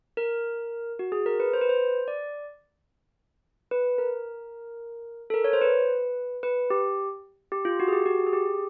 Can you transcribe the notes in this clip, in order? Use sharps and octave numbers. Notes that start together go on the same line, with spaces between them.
A#4
F#4
G#4
A#4
B4
C5
B4
C5
D5
B4
A#4
A4
A#4
C#5
C5
B4
B4
G4
G4
F4
F#4
G#4
G4
F#4
G#4
G4